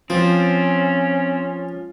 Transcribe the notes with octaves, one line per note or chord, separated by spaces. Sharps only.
F3 C4 C#4 F4